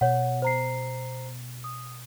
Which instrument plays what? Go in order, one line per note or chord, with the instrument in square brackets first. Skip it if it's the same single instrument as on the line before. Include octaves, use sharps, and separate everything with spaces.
[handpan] B2 [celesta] C#5 F#5
[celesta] C5 A#5 C7
D#6